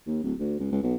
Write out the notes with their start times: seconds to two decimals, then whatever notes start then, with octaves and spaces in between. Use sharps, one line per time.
0.07 D#2
0.23 D1
0.39 D2
0.59 C#2
0.71 C#2
0.83 B1